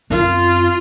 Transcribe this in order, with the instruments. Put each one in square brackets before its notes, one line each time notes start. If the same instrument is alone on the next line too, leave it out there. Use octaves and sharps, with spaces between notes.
[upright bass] F#2 C4 [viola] F4